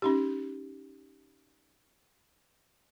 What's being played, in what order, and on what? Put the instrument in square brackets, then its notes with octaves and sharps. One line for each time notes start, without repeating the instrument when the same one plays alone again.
[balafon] C#4 D#4 G4